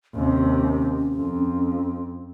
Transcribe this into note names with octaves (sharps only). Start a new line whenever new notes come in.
D#2 C3 C#4
F2